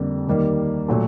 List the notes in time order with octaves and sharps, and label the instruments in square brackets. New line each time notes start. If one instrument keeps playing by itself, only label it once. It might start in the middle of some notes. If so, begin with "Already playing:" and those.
Already playing: [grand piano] F2 D3 G3 A#3
D#2 D#3 G3 A#3
A#2 F#3 A3